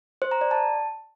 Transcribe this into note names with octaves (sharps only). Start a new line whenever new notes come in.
C5
A#5
D5
A5